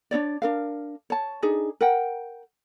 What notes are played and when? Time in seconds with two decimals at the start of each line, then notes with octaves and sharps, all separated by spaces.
0.11 D4 D#4 C#5 D5
0.42 D4 A#4 F5
1.10 C#5 A5
1.42 D4 D#4 G#4
1.81 A#4 F#5 G5